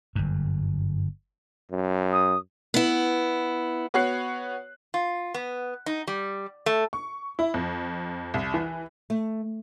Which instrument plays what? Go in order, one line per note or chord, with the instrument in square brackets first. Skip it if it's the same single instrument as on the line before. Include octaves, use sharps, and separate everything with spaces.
[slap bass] G1 F#2
[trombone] F#2
[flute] D#6
[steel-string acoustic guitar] B3 E4
[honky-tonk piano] B3 F#4 C#5 F#6 C7
[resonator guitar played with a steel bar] F4
B3
D#4
G3
A3
[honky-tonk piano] C#6
E4
F2
C2
E3
[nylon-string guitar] A3